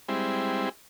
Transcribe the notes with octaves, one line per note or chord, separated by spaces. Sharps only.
G3 G#3 C4 E4